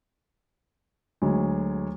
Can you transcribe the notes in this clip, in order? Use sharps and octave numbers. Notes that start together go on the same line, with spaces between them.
D2 D3 F#3 G#3